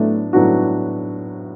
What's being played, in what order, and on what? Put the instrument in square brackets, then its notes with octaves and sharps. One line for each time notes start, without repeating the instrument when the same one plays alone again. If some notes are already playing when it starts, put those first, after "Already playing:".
Already playing: [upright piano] A2 F#3 B3 D4 [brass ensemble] A3
[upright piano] A2 F#3 B3 D4 F#4